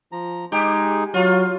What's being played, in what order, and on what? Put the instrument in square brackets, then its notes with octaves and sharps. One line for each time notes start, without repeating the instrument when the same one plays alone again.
[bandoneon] F3 A#5
[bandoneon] G#3 D#4 G#4 [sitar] G4
[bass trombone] F#3 [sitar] F4 [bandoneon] F#4